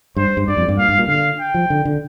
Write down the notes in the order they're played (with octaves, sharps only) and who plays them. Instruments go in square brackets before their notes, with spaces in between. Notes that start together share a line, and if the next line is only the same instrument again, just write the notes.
[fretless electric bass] G2 [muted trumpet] C5
[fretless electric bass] G2
[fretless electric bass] G2 [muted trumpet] D5
[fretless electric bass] F2
G2
[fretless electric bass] A#2 [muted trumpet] F5
[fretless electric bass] G2
A#2
[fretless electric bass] D3 [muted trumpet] F5
[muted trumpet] G5
[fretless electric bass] F3
D3
D3